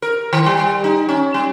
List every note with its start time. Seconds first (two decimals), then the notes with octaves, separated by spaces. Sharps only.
0.02 A#4
0.33 D#3
0.46 G3
0.84 D#4
1.09 C#4
1.34 G3